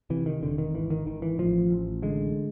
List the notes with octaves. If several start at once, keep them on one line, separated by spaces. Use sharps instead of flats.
C3 E3
D#3
E1 D3
D#3
G#1 E3
D#3
G#1 D#3
E3
A1 F3
A1
D3 G#3